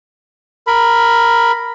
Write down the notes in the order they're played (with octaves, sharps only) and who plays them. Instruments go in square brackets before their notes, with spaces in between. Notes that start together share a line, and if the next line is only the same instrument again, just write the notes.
[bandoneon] A#4 B5